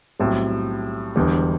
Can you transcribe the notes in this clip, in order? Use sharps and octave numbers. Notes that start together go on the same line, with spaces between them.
B1 A2 G3 C4
E1 E2 D3 G3